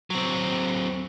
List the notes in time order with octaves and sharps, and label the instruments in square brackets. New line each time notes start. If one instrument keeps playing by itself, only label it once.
[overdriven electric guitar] F#3 C4